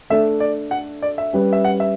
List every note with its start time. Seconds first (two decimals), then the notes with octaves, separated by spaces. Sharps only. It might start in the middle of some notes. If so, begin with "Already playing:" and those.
0.10 A3 D4 A4 E5
0.40 D5
0.71 F#5
1.02 D5
1.18 E5
1.33 G3 C#4 G4 B4
1.53 E5
1.65 F#5
1.80 E5